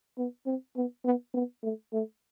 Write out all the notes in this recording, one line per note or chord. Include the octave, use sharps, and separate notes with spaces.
B3
C4
B3
B3
B3
A3
A3